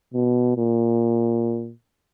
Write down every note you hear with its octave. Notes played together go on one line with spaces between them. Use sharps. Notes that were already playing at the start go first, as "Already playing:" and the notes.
B2
A#2